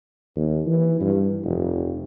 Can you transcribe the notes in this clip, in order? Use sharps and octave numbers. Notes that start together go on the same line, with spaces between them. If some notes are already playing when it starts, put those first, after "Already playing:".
D#2
E3
G2
F1